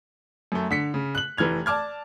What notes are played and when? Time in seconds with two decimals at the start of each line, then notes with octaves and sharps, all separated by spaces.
0.52 F#2 A3
0.71 D3 B6 C#7
0.94 C#3
1.15 F#6 F#7
1.37 F1 E3 F6 G#6 F7
1.66 D5 A5 D6 F6 G#6